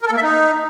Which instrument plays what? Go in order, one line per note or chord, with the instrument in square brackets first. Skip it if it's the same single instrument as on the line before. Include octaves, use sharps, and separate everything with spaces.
[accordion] A#4
A4
A#3
E5
D#4